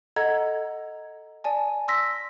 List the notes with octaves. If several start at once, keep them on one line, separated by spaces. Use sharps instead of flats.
A4 D#5 F#5 A#5 G#6
D5 G#5 A5
C6 E6 A#6 B6